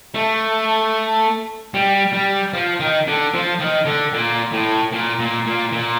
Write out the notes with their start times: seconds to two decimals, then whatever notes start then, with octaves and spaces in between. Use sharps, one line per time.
0.14 A3
1.74 G3
2.13 G3
2.54 F3
2.80 D#3
3.07 D3
3.34 F3
3.60 D#3
3.86 D3
4.13 A#2
4.52 A2
4.93 A#2
5.19 A#2
5.46 A#2
5.72 A#2